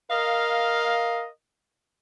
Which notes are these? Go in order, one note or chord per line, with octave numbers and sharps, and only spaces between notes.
A#4 D#5 F5